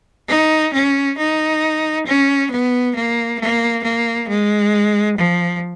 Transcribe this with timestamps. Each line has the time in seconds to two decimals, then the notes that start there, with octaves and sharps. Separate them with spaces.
0.29 D#4
0.73 C#4
1.18 D#4
2.07 C#4
2.51 B3
2.95 A#3
3.39 A#3
3.83 A#3
4.29 G#3
5.17 F3